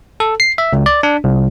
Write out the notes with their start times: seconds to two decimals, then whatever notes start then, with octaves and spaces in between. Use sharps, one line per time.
0.20 A4
0.40 C7
0.58 E5
0.73 C#2
0.86 D5
1.03 D4
1.24 C2